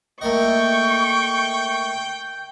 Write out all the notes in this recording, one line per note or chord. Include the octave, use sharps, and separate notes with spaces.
A3 A#3 D#5 G5 C#6